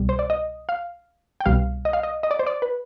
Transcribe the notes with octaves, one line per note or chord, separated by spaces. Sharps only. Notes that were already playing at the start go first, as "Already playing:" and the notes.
Already playing: C2 B2 G3
C5
D5
D#5
F5
G5
C2 B2 G3 F5
D#5
F5
D#5
D#5
D5
C5
D5
B4